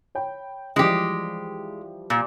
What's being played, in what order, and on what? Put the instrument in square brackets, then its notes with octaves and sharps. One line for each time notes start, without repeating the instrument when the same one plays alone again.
[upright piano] C#5 G5 B5
[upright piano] E3 F3 G3 [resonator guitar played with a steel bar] G#3 G4
[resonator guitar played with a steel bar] A#2